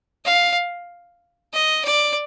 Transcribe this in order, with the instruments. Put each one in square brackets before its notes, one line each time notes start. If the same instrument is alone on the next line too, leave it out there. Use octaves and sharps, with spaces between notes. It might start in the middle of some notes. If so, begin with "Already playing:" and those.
[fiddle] F5
D#5
D5